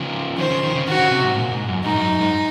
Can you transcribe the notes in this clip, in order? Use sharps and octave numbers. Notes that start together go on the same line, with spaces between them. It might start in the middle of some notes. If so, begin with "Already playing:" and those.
Already playing: C#3 F3
D#3 C5
C#3
D#3
C#3
D#3 F#4
C#3
C3
G#2
A#2
G#2
F#2
G#2 D#4
F#2
G#2